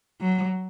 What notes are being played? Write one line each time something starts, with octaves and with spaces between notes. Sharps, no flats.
F#3